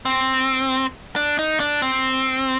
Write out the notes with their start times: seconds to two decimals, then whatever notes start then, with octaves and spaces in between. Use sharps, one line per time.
0.05 C4
1.16 D4
1.39 D#4
1.60 D4
1.82 C4